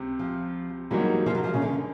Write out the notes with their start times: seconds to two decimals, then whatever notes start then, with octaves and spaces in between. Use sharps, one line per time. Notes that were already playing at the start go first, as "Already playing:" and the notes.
Already playing: C#2 C3 C4
0.19 F3
0.91 G#2 E3 F#3 G3 A#3 D#4
1.26 F3
1.35 F#3
1.44 F3
1.54 C#3
1.62 D3